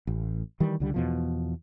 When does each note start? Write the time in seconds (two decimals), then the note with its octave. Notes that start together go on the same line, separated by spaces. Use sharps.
0.07 A1
0.60 D#3 E3 G3
0.80 C#2 D3 G3
0.94 E2 B2 F3